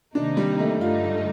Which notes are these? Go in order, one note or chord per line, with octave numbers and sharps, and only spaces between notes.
C3 D#3 A#3 D4 D#4
G3
A3
G2 D3 A3 D#4 F4